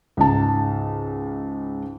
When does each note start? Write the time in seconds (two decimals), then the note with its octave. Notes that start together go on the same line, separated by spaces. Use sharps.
0.17 C#2 G#2 A5